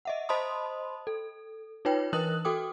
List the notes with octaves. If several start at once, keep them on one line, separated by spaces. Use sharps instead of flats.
D#5 E5 F#5
C5 D#5 A5 B5 C6 D#6
A4
D#4 F4 B4 C#5 G5
E3 A#4 B4 D#6 F#6 F#7
F#4 A4 G5 D6 D#6